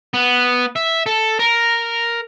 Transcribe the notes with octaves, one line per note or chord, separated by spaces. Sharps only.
B3
E5
A4
A#4